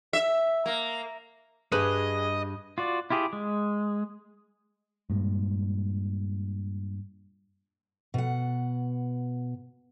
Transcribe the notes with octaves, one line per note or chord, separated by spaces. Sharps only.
E5
A#3
G2 D4 G#4 B4 D#5
F4 F#4 D5
E4 F4 G4 G#4
G#3
G2 A#2 G#3
B2 F#5